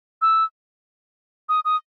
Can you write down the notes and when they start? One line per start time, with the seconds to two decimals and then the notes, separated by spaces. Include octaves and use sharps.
0.22 E6
1.49 D#6
1.65 D#6